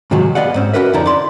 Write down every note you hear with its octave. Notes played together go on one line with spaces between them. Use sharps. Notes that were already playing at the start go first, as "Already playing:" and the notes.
G#2 C3 D#3 F3 F#3 G#3
B3 G#4 D5 D#5 F5 F#5
G#2 C4 C#4
C#4 D#4 F#4 A#4 B4 E5
F2 D3 D#4 E4 D5 A#5
D5 B5 C6